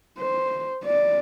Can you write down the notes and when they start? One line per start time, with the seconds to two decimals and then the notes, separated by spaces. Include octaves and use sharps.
0.19 C5
0.85 D5